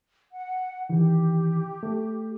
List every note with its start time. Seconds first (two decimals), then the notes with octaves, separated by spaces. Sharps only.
0.32 F#5
0.89 D#3 E3 G4
1.83 A3